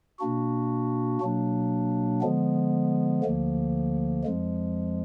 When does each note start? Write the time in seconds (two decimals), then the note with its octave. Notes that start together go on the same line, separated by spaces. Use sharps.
0.19 B2 A#3 D4 F#4
1.21 B2 F#3 A#3 D4
2.21 D3 F3 G#3 B3
3.23 D2 D3 F3 A#3
4.24 F2 F3 G#3